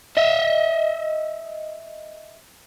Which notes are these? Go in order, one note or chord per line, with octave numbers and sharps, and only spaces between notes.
D#5 E5